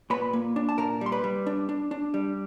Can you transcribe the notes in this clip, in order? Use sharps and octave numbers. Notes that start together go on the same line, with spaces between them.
A#2 B4 B5
A#3
D4
A5
A#2 A#4 A#5
G3 C6
B4 B5
G3
D4
D4
D4
G3